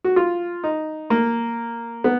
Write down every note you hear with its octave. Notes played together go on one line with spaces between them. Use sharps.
F#4
F4
D#4
A#3
B3